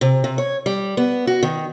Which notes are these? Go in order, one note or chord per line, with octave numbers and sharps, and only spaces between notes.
C3
C3
C#5
G3
B3
F#4
D#3